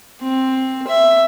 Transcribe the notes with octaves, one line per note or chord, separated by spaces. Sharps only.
C4
E5